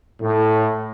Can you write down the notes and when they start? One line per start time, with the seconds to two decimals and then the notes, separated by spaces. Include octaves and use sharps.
0.20 A2